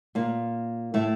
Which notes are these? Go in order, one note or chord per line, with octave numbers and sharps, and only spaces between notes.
A#2 A#3
A2 A3